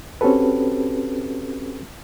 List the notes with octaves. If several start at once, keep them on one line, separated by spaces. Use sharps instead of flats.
C4 C#4 F#4 G4 A4 B4